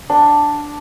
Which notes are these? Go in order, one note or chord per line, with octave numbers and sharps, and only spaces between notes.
D4